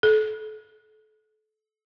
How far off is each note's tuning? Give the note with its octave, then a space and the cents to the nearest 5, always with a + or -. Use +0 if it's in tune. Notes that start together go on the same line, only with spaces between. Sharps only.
A4 -30